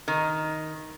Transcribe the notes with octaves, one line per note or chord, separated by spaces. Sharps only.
D#3